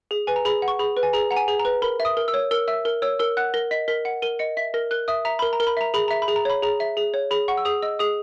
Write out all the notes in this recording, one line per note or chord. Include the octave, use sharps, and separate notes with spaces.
G#4
B4 G#5
A#5
G#4 B5
F#5
C#6
G#4 B5
B4
G#5
G#4 A#5
F#5 A#5
G#5
G#4
A#5
B4
A#4 B5
E5
D#6
A#4
E6
C#5
A#4 E6
E5 E6
A#4
C#5 E6
A#4 E6
F#5 F#6
A#4 A#6
D#5 B6
A#4 B6
F#5 C#7
A#4 D#7
D#5 C#7
E5 B6
A#4 A#6
A#4 F#6
E5 D#6
E5 A#5
A#4 B5
A#5
A#4
B5
E5 A#5
G#4 B5
E5 A#5
B5
G#4
A#5
C#5 B5
G#4 A#5
E5
G#4
C#5
G#4 B5
F#5 C#6
E6
G#4 D#6
D#5 E6
G#4 D#6